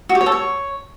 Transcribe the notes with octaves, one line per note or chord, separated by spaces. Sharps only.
F#4
G4
C#5
A4
C#5